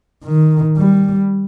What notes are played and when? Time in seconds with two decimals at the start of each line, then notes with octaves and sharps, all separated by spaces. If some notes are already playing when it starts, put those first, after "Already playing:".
0.25 D#3
0.77 G3